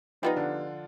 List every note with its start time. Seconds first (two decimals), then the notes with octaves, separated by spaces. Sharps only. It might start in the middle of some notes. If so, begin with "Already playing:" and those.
0.22 F3 G3 B3 D#4 F4
0.36 D3 D4